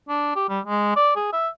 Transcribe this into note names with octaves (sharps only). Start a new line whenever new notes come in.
D4
G4
G3
G#3
D5
G#4
E5